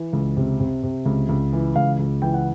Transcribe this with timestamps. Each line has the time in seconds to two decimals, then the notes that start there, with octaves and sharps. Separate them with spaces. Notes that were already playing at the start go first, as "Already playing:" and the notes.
Already playing: E3
0.13 C#2
0.37 C3
0.60 C3
0.83 C3
1.06 C#2
1.29 C#2
1.53 E3
1.76 C#2 F5
1.99 C#2
2.22 E3 G5
2.34 F#5